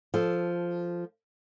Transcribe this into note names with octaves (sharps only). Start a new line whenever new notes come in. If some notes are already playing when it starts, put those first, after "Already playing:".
F3 A4